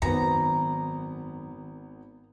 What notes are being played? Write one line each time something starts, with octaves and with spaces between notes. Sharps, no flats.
G#1 F#2 D#3 B3 A#5